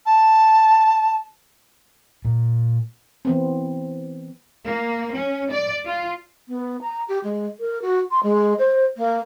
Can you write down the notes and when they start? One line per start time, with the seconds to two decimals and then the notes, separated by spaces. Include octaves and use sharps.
0.06 A5
2.25 A#2
3.25 E3 B3 C4
4.65 A#3
5.14 C#4
5.50 D5
5.85 F4
6.48 B3
6.81 A#5
7.08 G4
7.24 G#3
7.60 A#4
7.82 F#4
8.11 C6
8.23 G#3
8.59 C5
8.97 A#3